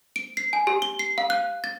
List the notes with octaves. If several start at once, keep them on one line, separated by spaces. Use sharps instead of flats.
D7
C7
G#5
G4
G7
C7
F5
F#6
A6